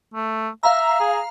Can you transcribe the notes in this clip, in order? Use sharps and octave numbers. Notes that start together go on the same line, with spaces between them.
A3
E5 F5 A#5
G#4